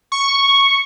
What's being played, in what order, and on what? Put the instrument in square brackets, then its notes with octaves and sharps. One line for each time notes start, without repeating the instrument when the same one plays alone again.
[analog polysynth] C#6